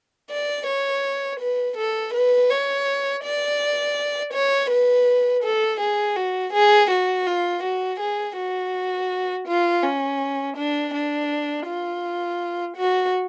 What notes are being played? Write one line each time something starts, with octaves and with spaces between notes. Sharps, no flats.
D5
C#5
B4
A4
B4
C#5
D5
C#5
B4
A4
G#4
F#4
G#4
F#4
F4
F#4
G#4
F#4
F4
C#4
D4
D4
F4
F#4